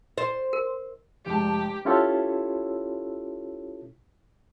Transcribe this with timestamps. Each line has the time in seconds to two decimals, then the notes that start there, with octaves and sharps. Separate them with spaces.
0.18 C5 D#5
0.53 A#4
1.26 F1 G#3 G4 A5
1.85 C#4 E4 F4 G4 A4 C#5